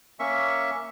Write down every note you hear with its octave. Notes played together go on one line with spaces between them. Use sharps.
A#3 C#4 E5 C#6